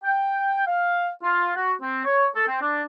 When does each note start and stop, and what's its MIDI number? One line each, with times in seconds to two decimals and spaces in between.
0.03 0.65 79
0.67 1.09 77
1.23 1.51 65
1.56 1.72 66
1.81 2.02 60
2.05 2.27 73
2.35 2.47 69
2.48 2.61 60
2.61 2.83 62